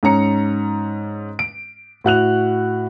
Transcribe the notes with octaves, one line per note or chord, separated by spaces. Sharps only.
G#2 C#4 A#5 C#7
D7
A2 F#4 F#6 F7